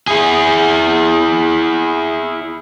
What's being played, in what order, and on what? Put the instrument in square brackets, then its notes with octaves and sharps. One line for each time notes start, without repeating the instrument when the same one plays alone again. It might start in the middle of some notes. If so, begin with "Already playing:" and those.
[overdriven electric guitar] E4 G#4